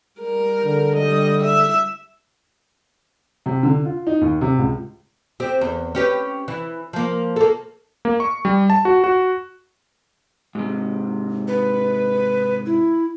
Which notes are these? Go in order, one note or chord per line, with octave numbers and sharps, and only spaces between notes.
G3 A#4
D3
G3 D#5
E5
C3
D3
F4
D#4
D#2
C3
C#2
C4 G4
E2
C#4 G4 B4
E3
F3 A#3
A#3 A4
A#3
C#6
G3
A5
F#4
F#4
G#2 C3
B4
E4